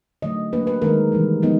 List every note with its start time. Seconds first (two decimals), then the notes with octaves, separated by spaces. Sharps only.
0.22 D3 F#3 A3 D#5
0.52 F#3 A#3 D4 B4
0.67 B4
0.82 D#3 G#3 C4 D#4 A#4
1.12 C3 E3 G3
1.42 F3 G#3 B3 D#4